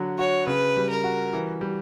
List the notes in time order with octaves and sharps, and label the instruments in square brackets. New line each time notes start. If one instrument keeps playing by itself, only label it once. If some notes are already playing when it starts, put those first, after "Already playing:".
Already playing: [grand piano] D3 F#3
[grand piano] F#4 [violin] C#5
[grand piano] C#3 [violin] B4
[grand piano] G3
[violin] A#4
[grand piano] F#4
E3
G3